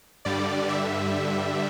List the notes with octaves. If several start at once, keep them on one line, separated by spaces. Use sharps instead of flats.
G2 D3 G3 D5
E5